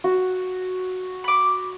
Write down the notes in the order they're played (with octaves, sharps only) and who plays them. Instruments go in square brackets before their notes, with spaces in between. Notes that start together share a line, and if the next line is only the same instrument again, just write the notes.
[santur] F#4
[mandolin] B5 D6